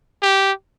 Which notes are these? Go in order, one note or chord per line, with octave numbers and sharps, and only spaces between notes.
G4